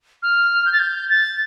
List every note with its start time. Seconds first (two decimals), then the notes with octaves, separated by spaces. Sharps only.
0.23 F6
0.66 G6
0.73 A6
0.79 G6
1.09 A6